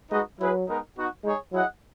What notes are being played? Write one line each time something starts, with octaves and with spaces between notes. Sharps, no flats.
G#3 D#4 F#4 B4 D#5
F#3 E4 G#4 B4
G#3 B3 D#4 A#4
B3 D#4 F#4
G#3 D#4 G#4 C#5
F#3 E4 G#4 D#5 F#5